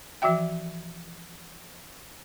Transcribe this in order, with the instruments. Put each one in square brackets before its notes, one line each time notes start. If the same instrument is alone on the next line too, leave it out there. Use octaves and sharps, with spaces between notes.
[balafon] E3 F3 F#4 E5 G5